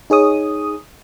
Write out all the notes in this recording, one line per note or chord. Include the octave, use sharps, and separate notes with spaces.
D#4 G#4 C#5 D#6